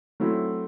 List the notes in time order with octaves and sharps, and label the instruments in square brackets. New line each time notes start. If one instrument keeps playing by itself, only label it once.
[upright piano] F#3 A3 C4 E4